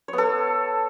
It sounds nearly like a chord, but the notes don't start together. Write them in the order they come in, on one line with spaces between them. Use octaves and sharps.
C#5 B3 A4